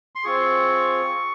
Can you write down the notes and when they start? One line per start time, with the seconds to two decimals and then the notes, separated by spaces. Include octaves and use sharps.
0.15 C6
0.24 C4 F4 G#4 C#6